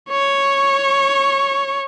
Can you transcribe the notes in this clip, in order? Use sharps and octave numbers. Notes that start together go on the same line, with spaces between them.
C#5 C#6